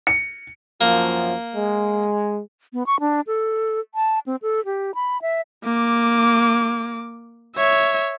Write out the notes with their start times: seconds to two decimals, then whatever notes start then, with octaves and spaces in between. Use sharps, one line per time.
0.07 C#7
0.81 F#2 F3 A#3
1.55 G#3
2.73 B3
2.87 C#6
3.00 D4
3.27 A4
3.95 A5
4.26 C4
4.42 A4
4.65 G4
4.95 B5
5.22 E5
5.64 A#3 D6
7.56 C#5 E5